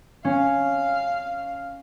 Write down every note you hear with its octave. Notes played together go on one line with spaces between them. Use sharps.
C#4 F5